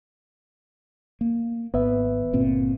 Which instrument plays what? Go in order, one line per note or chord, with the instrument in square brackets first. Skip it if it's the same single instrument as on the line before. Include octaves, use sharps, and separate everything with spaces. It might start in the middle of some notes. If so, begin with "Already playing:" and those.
[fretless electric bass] A#3
[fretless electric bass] G#1 [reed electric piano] B3 B4 E5
[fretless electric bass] G1 A#2 C4